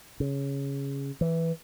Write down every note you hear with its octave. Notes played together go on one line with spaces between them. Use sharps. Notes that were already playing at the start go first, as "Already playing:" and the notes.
C#3
E3